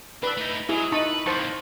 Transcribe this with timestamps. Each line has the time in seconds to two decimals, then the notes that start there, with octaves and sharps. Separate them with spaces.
0.23 D4 B4 E6
0.37 A3 D#4
0.69 F#3 E4 G#4
0.92 D#4 B4 A5 C#6
1.26 F2 A#3 C5 A5 C#6